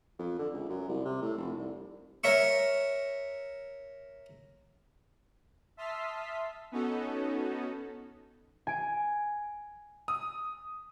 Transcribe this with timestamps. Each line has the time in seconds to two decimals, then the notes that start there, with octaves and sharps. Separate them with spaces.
0.19 F2
0.39 D3
0.53 C#2
0.69 F#2
0.88 C2
1.05 C3
1.22 A2
1.37 F1
1.58 C2
2.24 A#4 C#5 E5 C#6
5.77 E5 A5 C6 D#6 F6 B6
6.72 B3 C#4 D#4 F#4 A4
8.67 G#5 D7
10.08 D#6